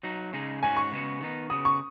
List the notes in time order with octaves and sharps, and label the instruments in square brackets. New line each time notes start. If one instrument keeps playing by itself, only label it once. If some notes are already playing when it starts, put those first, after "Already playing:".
[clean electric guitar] F#3 D#4 F#4
C#3 G#3 D#4 G#4
[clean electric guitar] G#2 G#3 C#4 F#4 [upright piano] G#5
[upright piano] C#6
[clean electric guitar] C#3 G#3 B3 F#4
D#3 B3 D#4
[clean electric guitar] C#3 B3 F#4 [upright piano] D#6
[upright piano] C#6